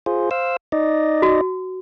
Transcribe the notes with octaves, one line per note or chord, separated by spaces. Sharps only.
F4 G#4 C5
C5 F5 E6
D#4 D5 D#5
F#4